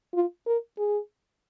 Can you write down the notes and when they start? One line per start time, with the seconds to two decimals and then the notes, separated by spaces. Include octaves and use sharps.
0.14 F4
0.46 A#4
0.78 G#4